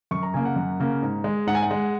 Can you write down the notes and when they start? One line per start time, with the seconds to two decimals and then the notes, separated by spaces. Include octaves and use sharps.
0.11 F#2 C#6
0.23 A#5
0.34 C#3 A#3 G#5
0.45 F#5
0.56 F#2
0.80 C#3 A#3
1.03 G#2
1.24 G#3
1.47 G#2 F#5
1.55 G#5
1.63 F#5
1.71 G#3